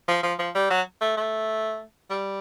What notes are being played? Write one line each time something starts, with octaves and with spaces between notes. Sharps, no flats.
F3
F3
F3
G3
F#3
A3
A3
G3